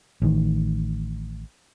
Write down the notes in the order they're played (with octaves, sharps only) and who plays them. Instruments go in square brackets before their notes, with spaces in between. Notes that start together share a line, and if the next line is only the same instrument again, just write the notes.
[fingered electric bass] A1 D#3